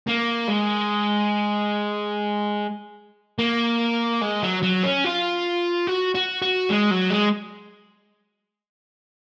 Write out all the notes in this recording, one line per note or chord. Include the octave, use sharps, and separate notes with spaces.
A#3
G#3
A#3
G#3
F#3
F#3
C#4
F4
F#4
F#4
F#4
G#3
F#3
G#3